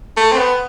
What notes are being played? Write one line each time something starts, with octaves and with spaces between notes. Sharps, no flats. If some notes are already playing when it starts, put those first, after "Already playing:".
A3
C4
B3